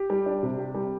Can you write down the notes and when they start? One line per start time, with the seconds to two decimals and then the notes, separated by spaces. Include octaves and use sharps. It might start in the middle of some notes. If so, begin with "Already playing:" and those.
Already playing: G4
0.10 G3
0.26 D4
0.43 C3
0.59 G4
0.74 G3